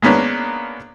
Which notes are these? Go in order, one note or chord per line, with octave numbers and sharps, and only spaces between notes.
G#3 A#3 B3 C#4 D4